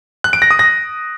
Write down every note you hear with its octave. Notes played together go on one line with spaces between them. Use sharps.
F#6
D7
A#6
D#6
A#6